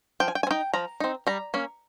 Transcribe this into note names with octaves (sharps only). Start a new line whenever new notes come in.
F3 G5
G#5
G5
G#5
C4
D#4 G5
F3 A#5
C4 D#4
G3 A#5
A#3 C#4